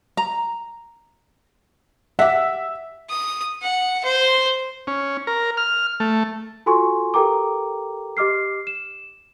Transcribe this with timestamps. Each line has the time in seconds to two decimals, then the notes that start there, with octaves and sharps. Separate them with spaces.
0.17 A#5
2.19 G4 E5 F#5
3.10 D#6
3.62 F#5
4.05 C5
4.87 C#4
5.27 A#4
5.57 F6
6.00 A3
6.66 F4 F#4 A4 G#5 C6 C#6
7.14 G4 A4 A#4 G5 A#5 D6
8.17 G4 D#5 D6 F6 C7
8.67 E7